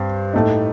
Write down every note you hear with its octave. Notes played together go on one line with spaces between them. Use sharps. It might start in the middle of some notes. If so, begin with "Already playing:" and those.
Already playing: G2 C4
A2 A3 D#4